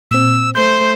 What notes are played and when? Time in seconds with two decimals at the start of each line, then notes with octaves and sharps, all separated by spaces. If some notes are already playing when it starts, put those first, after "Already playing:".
0.11 A#2 C4 E6
0.55 A3 C5 C6 G6